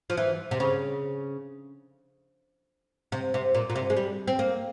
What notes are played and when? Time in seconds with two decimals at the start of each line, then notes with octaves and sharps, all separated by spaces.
0.10 F3
0.17 E3
0.51 C3
0.60 C#3
3.12 C3
3.34 C3
3.55 A#2
3.70 A#2
3.76 C3
3.90 G#3
3.97 G3
4.28 C4
4.39 A#3